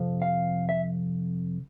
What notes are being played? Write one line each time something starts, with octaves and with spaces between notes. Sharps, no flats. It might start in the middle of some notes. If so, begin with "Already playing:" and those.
Already playing: F2 C3 F3
F5
E5